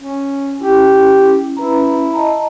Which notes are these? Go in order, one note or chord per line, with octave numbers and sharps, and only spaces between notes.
C#4
C#4 E4 G4
C#4 E4 B4 A#5
D#5 A5 A#5